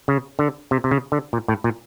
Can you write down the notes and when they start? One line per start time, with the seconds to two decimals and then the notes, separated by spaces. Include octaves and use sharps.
0.08 C#3
0.39 D3
0.71 C3
0.84 C3
0.91 C#3
1.12 D3
1.33 A#2
1.48 A2
1.64 A#2